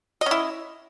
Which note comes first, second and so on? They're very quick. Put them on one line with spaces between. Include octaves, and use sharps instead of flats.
D#5 C#4 E4